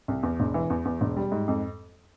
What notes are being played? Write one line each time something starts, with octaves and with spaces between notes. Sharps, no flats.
C2
E2
E1
E3
E2
E2
E1
G3
G#2
F2